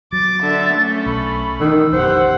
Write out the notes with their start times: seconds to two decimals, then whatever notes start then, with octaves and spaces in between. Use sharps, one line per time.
0.13 F#3 D6 A6
0.42 D3 E5
0.74 A3 C#4
1.06 B1 B5
1.60 D#3 E3 E6
1.93 F#1 B1 F#2 G4 C5 F#5